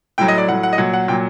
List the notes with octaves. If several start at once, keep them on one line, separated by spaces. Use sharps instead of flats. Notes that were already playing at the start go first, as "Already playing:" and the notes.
A2 F#3 G5
D#5
D5
A2 F#3 F#5
F#5
D#5
A#2 F#3 F#5
F#5
A#2 F#3 G5